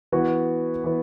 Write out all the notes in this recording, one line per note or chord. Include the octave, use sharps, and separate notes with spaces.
E3 B3 F#4
E3 B3